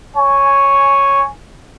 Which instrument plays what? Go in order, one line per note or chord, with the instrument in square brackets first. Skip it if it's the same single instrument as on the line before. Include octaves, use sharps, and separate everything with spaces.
[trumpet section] C#5 G#5